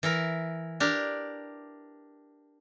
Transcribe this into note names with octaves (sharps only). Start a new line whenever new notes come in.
E3 E4 A#4
D4 G4 A#4